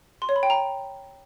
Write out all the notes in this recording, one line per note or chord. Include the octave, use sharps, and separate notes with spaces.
C6
C#5
B5
G5
A#5